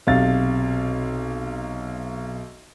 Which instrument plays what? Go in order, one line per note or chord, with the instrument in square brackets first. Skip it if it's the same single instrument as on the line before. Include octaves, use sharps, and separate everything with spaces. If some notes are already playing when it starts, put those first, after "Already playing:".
[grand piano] B1 C3 F5 A6